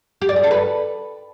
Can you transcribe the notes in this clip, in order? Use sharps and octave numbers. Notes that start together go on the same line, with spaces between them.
G4
D5
G#4
A4
B4